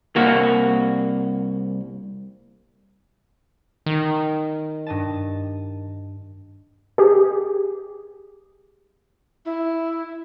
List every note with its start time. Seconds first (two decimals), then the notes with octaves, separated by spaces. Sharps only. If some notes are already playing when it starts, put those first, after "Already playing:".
0.16 C2 A#3 F#4
3.86 D#3
4.86 G2 D#5 A5
6.98 G4 G#4
9.46 E4